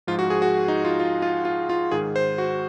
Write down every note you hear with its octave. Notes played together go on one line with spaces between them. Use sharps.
G#2 F3 F4
F#4
G#4
F#4
D#4
F4
F4
F4
F4
F4
G#2 D#3 G#4
C5
F#4